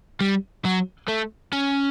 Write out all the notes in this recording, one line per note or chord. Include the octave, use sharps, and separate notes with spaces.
G3
F#3
A3
C#4